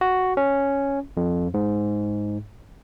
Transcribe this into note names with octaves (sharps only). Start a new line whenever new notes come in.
F#4
C#4
F2
G#2